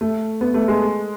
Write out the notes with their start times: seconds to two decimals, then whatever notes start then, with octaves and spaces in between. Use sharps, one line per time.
0.01 A3
0.41 B3
0.54 A3
0.68 G#3